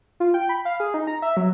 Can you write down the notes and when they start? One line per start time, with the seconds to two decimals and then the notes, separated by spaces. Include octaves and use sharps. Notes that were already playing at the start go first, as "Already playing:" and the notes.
0.20 F4
0.34 G5
0.49 B5
0.65 F5
0.80 G#4
0.94 D#4
1.07 A#5
1.22 E5
1.37 F#3